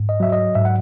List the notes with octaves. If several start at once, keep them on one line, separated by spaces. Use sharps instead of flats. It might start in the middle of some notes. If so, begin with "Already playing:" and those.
Already playing: G#2
D#5
F#3 E5
D#5
G#2 E5
F#5